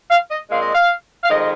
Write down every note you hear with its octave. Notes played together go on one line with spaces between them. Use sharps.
F5
D#5
A#2 G#3 C4 F5
D#5
F5
F5
F2 D#3 G#3 D#5
D#5